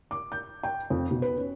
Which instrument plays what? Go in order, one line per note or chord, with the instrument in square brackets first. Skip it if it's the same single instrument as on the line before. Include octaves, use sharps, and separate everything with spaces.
[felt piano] D6
G6
G5
F2
B2
B4
C#4